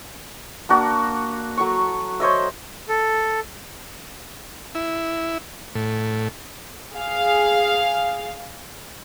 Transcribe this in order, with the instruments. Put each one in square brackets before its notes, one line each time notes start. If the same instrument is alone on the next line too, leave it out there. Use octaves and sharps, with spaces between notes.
[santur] A#3 D4 F#4 A5
F#3 A4 C#6
C5 C#5 D#5 E5
[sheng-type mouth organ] A4
[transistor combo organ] E4
A2
[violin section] G#4 F5